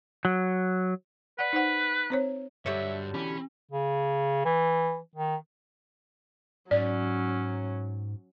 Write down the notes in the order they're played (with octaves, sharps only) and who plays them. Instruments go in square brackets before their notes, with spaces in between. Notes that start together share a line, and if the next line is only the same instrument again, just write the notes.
[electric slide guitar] F#3
[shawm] B4 [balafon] D5 F#5
[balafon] D#4 C5 F#5
C4 C5 C#5
[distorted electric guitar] G2 [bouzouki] D3 F#3 G3 [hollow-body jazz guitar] C#5 [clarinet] E5
[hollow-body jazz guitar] B2 E3 G4 [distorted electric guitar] C#4 [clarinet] B5
[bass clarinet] C#3
E3
D#3
[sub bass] G#2 [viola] F#3 C#4 [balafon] D5